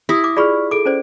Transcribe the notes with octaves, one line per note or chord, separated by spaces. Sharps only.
E4 G4 D#6 A#6
D6
F4 G#4 D5 B5 C#6 F6
G#4 A4 D6 D7
C#4 C5 D5